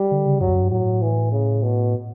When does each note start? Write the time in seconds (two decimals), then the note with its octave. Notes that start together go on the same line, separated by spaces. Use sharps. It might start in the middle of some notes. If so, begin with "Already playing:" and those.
Already playing: G3
0.11 D3
0.26 C#3
0.41 F#2 F#3
0.48 E2
0.51 F#2
0.61 G2
0.71 A2 F#3
1.02 E3
1.32 C#3
1.62 B2